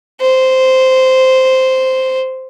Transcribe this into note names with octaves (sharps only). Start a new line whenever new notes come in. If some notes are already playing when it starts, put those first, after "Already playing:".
C5